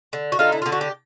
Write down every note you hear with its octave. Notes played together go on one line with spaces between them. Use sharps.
D3
F#4
D3 D#4 F4
E4
D3 F4
F#4
G4